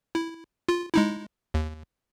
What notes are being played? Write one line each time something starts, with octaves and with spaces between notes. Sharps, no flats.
E4
F4
G#3 D#4 E4
D#2